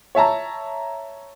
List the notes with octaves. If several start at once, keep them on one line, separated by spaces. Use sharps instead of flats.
C#5 E5 A5 A#5